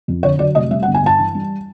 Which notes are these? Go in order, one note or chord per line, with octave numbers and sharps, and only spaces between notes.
F2
D3 C#5
F#3 D5
F1 D#5
G3 E5
F#5
G1
G#5
G2 A5
E3
G3